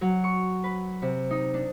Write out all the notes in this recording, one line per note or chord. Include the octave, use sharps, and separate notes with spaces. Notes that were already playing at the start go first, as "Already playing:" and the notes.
F#3
C#6
B4
C3
D#4
D4